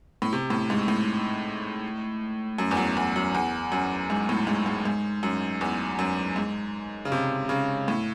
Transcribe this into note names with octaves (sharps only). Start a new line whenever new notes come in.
A2
C3
A2
G#2
A2
F#2
E2
F#2
E2
F#2
E2
F#2
G#2
A2
G#2
G#2
G#2
F#2
E2
F#2
G#2
C#3
C3
C#3
A2